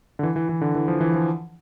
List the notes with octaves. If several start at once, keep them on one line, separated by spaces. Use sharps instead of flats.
D3
E3
E3
E3
D3
E3
F3
E3
F3